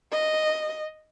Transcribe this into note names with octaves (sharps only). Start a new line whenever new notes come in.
D#5